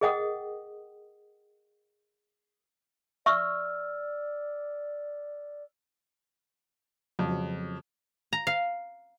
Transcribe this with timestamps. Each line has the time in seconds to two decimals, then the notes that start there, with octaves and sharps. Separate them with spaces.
0.01 G#4 A#4 D#5 F#5 G5 D#6
3.26 D5 E5 C#6 E6 F6
7.19 F2 C#3 F3 F#3
8.33 A#5
8.47 F5